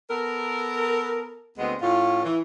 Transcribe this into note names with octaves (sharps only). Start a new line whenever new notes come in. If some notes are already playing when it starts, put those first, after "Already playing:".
B3 A4 A#4
D2 G#3 B3 C4 D#5
A2 C#4 F4
E3